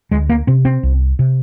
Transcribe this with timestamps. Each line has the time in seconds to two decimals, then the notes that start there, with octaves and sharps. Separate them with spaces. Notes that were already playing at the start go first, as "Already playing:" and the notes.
0.11 D2 G#3
0.29 A#3
0.47 C3 C4
0.65 C4
0.83 C2
1.19 C3